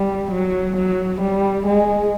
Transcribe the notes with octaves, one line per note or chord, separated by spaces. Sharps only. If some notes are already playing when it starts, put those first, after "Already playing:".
Already playing: G3
F#3
F#3
G3
G#3